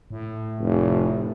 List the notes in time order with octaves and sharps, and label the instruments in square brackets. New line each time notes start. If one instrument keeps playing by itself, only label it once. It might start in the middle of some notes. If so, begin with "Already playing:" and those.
[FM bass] A2
[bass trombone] F1